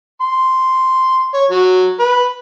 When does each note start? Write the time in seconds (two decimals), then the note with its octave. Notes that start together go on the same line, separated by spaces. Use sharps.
0.21 C6
1.34 C#5
1.50 F#3
2.00 B4